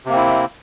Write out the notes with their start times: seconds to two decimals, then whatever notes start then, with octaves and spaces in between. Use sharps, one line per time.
0.06 C3
0.09 A#3
0.13 C4
0.16 E4